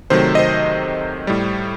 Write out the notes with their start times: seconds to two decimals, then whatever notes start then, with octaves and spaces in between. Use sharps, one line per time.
0.10 C3 D#3 F#3 A3 C5
0.35 D#5
0.39 C5
1.27 A2 G3